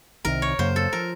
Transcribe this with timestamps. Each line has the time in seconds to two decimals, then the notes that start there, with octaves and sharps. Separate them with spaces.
0.25 C2 C3 D#3 A#4
0.42 C#5
0.59 F#2 C#3 F#3 A#3 C5
0.76 A4
0.93 F3 A#4